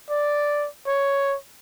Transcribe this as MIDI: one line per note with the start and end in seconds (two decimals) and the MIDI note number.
0.10 0.68 74
0.87 1.37 73